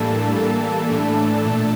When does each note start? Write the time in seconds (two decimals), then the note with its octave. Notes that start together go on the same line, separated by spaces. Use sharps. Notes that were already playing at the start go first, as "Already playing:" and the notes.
Already playing: A2 E3 G3 A#3 D4 A4 A5
0.35 E3 G3 A#3
0.90 A2 E3 A3 D4
1.45 A#2 A3 D4